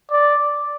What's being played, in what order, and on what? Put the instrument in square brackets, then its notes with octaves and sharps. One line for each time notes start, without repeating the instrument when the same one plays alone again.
[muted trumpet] D5